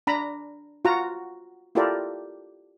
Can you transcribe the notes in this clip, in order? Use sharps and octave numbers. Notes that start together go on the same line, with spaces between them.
D4 A#5 B5
F4 F#4 F#5 A#5
E4 F4 G4 A4 A#4 D5